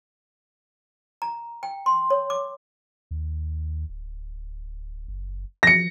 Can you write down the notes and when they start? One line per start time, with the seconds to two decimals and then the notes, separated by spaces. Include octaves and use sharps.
1.22 A#5
1.63 G5
1.86 C6
2.10 C#5
2.30 D6
3.11 D#2
3.89 D1
5.08 F#1
5.63 F3 A#6 C#7